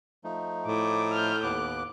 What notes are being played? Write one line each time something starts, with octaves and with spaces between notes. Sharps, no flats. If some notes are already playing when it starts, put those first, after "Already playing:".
F3 A3 D#4
A2 D6
F6 G6
D#2 B3 D6 F#6